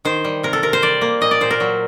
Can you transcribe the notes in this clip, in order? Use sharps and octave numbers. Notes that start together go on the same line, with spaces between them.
D#3 C5
G3
C3 A#4
A4
C3 A#4
C5
G3 D5
A#3
A#2 D#5
D5
A#2 C5
A#4
F#3